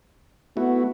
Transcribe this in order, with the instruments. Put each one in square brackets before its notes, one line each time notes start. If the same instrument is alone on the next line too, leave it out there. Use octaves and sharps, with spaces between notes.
[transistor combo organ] A3 E4 F#4 [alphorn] B3